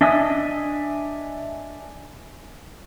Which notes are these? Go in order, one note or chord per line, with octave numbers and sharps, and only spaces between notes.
D4 D#5 E5 G#5 D#6